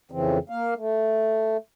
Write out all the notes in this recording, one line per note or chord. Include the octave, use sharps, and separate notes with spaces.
F2 C#3 E3 C4
A#3 F5
A3